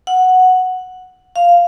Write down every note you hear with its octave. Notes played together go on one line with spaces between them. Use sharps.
F#5
F5